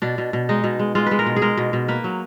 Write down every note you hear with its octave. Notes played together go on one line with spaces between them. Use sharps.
B2 D4
B2
B2
G#3 D#4
B2
G#3
G#3 F4
G#3 B4
A#4
B2
G#4
G#3 A#4
B2
B2
A#3 B4
F#3